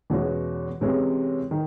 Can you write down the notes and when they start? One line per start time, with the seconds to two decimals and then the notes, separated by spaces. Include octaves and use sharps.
0.10 E2 B2 G#3 C#4 F#4
0.81 C3 E3 G#3 C#4
1.51 D#3